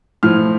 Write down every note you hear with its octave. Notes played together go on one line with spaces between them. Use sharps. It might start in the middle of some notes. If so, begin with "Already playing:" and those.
A2 F3 F6